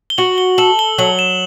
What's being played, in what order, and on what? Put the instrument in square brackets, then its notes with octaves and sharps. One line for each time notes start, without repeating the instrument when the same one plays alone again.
[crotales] G7
[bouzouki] F#4 [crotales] F#7
[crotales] G7
[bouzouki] A4 [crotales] F#7
[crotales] G7
[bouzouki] F#3 [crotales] F#7
[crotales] E7